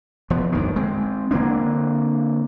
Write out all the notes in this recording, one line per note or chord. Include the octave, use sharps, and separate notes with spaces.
E1 F3 B3
G1 D2 D#3
G#3 C4
D3 A#3 C4 D4